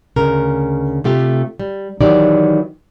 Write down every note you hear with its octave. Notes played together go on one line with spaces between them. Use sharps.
D2 C#3 A#4
C3 A3 F4 G4
G3
D#3 E3 F#3 D#4 G4 D5